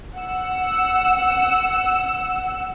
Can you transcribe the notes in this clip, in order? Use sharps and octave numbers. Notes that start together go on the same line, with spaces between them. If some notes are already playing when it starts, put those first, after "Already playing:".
F#5 E6